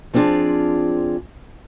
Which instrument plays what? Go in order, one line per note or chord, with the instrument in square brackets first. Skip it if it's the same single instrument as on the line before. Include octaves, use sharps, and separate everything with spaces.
[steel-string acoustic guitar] F3 C4 D4 F4 G#4 D5